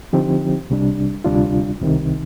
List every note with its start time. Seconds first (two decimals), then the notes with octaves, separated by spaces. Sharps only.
0.13 D3 F3 C4 D#4 G4
0.70 C2 C3 G3 D4
1.24 D2 C3 G3 D4 F4
1.81 C2 C3 D#3